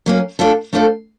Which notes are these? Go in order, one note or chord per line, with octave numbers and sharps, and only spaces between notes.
F#3 A#3 C#4
A3 D4 F4 A4
A3 D4 F4 A4 C5